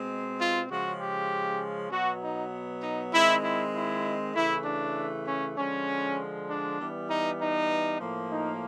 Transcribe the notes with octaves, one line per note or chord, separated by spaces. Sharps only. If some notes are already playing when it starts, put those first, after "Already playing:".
Already playing: B2 G#3 C4
F4
C#3 F3 G#3 C#4 F#4
G4
B2 F#3 B3 F#4
D#4
D#4
D#3 G#3 C4 E4
E4
E4
C#3 E3 A3 E4
D4
C#4
D3 F3 G#3 C#4
D4
E3 G3 B3
D#4
D#4
A2 F3 A#3
D#4